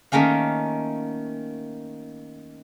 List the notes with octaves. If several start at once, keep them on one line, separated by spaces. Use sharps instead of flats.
D#3 A3 A#3 C#4 F5